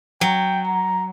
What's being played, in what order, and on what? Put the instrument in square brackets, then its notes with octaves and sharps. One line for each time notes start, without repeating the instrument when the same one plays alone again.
[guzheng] F#3 [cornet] G5
[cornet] A#5